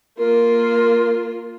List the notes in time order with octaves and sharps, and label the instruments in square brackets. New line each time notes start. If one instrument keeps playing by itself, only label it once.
[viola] A#3 F4 [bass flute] A#4